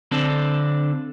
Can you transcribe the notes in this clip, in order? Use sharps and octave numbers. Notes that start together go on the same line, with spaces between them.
D3 C4 D4 A4